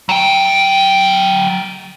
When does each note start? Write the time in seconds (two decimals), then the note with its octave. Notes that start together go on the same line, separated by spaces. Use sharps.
0.09 F#3 G5